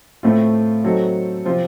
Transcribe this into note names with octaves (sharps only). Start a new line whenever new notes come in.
A2 A3 C4 F4
F#3 C4 D#4 A4
C3 F3 C4 F4